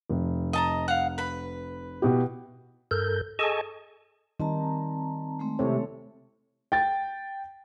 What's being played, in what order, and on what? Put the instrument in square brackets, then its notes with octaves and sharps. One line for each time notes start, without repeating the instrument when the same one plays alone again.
[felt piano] F1
[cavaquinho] D#5 A5 A#5
F5 F#5
B4 B5
[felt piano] B2 E4 G4
[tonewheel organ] G2 A4 A#4 G6
G#4 A4 D#5 G#5 A5 C#6
[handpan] D#3 G3 D#4 [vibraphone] C4 A5 A#5
[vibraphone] G#3 A3 C4
[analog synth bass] C3 [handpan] E4 A4 C#5
[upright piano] G5 A6